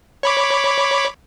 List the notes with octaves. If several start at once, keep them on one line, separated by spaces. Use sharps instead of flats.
C#5 B5 D6